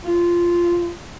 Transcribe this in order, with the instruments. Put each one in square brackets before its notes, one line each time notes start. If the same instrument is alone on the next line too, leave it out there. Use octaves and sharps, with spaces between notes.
[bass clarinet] F4